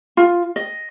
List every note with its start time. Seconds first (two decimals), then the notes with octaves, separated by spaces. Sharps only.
0.17 F4
0.56 D#5